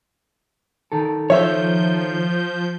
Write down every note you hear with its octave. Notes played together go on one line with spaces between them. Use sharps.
D#3 A4
F3 C#5 E5 G6